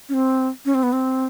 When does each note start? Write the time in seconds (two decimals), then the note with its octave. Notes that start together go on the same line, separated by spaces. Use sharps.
0.09 C#4
0.14 C4
0.65 C#4
0.74 C4
0.83 B3
0.92 C4